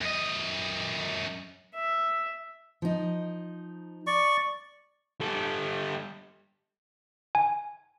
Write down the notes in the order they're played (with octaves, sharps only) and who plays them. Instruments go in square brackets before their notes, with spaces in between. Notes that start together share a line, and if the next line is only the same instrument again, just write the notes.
[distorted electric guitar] F#2 D#5
[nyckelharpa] E5
[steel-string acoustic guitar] F3 D#4
[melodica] D5 C#6
[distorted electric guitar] G3 A4
[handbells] G#5